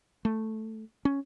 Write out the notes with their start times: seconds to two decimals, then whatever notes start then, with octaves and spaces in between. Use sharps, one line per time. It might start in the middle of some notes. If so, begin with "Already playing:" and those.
0.25 A3
1.05 C#4